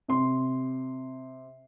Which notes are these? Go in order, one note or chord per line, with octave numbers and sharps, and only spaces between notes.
C3 C6